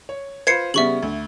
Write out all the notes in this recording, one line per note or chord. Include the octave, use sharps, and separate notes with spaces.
C#5
F4 B4 C5 G#6 C7 C#7
C#3 G3 B3 E5 C#6 F#7
D2